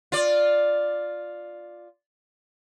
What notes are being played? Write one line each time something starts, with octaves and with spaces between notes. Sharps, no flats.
F4 D5